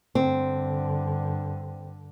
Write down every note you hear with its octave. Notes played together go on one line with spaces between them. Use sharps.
G2 D3 C4